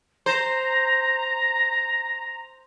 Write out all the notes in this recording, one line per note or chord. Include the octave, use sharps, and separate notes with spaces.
C5 A#5